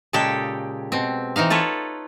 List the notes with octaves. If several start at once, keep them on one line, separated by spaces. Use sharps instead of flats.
A#2 C#3 G#3 G4 A4 G5
B2 C4
E3 C4 D#4 F5
F4 A4 B4 C#5